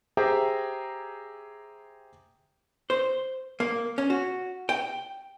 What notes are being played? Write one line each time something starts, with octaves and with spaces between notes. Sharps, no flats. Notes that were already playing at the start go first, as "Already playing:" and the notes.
G4 G#4 C5 E5 G5 A#5
C5
A#3
C#4
F#4
G5